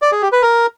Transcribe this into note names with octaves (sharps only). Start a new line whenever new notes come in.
D5
G#4
G4
B4
A#4